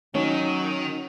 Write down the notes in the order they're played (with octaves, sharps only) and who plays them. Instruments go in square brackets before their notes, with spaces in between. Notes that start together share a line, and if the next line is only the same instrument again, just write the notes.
[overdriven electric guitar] D#3 [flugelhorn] F#3 [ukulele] C#4 [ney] D#4